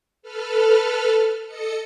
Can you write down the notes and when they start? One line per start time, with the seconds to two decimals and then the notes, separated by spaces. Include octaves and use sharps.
0.22 A4 B4 F6
1.46 A4 D#5 C#7